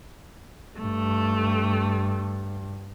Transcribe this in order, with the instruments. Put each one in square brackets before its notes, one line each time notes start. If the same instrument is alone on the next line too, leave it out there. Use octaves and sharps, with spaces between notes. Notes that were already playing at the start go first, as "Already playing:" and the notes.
[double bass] G2 [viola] A3